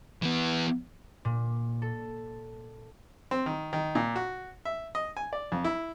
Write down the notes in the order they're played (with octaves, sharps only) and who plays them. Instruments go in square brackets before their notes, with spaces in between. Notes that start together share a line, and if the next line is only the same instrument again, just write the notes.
[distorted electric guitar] E3 B3
[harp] A#2
A4
[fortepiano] C4
D#3
D#3
A#2
F#4
E5
D#5
G#5
D5
F2
E4